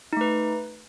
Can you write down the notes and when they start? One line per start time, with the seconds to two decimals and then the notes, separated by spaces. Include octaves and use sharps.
0.13 D#4
0.17 A3
0.21 B4